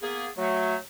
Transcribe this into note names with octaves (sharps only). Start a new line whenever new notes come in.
A#3 B3 G#4
F#3 A3